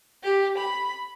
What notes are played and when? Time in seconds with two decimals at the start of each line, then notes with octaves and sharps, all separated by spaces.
0.24 G4
0.58 B5